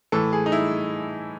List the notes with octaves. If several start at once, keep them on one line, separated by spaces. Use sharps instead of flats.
A2 E3 A4
G#4
D#4
E4